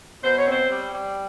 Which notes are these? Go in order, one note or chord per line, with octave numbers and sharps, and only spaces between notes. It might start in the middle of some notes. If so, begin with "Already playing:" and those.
B2 C5
C#5
C4 C5
G3
G3